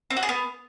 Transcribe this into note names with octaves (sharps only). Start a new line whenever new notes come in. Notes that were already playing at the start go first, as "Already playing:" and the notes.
C4
F#4
G#4
B3